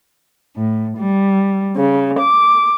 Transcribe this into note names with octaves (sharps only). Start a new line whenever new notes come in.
A2
G3
C#3
D6